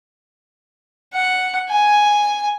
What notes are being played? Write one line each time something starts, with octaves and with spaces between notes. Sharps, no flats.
F#5
G#5